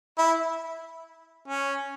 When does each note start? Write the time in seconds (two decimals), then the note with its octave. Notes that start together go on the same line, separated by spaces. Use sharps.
0.18 E4
1.48 C#4